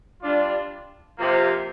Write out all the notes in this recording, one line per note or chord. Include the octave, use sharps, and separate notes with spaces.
G3 D4 F4
C3 F3 A#3